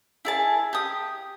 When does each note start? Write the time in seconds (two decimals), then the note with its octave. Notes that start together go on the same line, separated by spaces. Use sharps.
0.25 E4 G#4 A5
0.73 G4 D#6